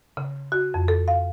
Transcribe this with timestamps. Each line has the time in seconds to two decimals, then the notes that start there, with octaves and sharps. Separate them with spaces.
0.17 C#3
0.52 F#4
0.74 F2
0.88 A4
1.08 F5